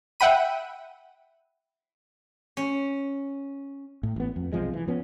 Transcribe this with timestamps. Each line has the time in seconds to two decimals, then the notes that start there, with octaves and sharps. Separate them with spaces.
0.20 E5 F#5 G5 B5 D#7
2.57 C#4
4.03 A2
4.16 A1 B3
4.36 F2
4.52 B1 C3 F3 G#3
4.73 E3
4.87 F3 B3 C#4